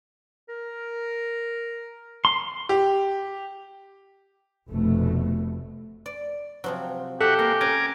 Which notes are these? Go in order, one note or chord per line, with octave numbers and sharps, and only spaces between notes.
A#4
C6
G4
F1 B2 A3
D5
C3 F3 F#3
F#4 G4 A4 E5 F#5
G#3 A#3
C#4 G#5 A#5 D6